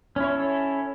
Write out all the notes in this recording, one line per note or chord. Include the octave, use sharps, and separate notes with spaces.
C#4 E4 A4 C#5